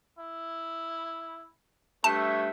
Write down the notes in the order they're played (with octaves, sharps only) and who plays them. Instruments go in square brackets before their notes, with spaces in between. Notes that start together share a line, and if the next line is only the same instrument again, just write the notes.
[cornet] E4
[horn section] G2 A3 E5 [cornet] C#5 [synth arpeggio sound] A5